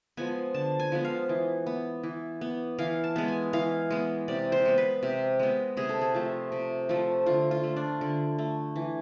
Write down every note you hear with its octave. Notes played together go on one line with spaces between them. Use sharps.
F3 G#3 B3 G#5
D3 A5
G#5
F3 G#3 B3
F5
E3
B3
E3
B3
E3 F5
A5
G#3 B3
G#5
E3 F5
G#3 B3
C3 D5
C5
G#3 B3
B4
C3
G#3 B3
C3 G#4
A4
G#4
F3 A3
C3
F3 A3
D3 F4
F4
A3
D4
D3
A3
E3